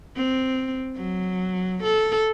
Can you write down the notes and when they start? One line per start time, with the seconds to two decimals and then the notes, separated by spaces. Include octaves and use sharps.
0.16 C4
0.97 F#3
1.83 A4